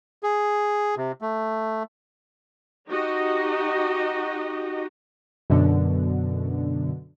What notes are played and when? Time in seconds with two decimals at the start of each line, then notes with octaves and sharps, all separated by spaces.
0.23 G#4
0.97 C3
1.22 A3
2.89 D#4 F#4 G4 D#5
5.50 F#2 B2 D3